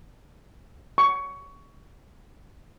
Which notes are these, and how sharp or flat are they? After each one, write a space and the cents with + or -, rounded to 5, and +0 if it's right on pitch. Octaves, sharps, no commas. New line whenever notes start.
C#6 +15